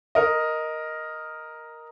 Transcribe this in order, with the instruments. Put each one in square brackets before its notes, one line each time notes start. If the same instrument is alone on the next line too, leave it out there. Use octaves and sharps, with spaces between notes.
[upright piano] A#4 D#5